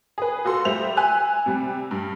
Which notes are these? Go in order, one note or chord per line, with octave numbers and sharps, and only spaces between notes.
G#4 B4
F4 F#4 A4 C6
G3 C5 E5 F7
G#5 E6 F#6
C3 G3
G2